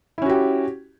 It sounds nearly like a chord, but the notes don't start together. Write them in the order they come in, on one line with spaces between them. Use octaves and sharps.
E4 C#4 F#4 G4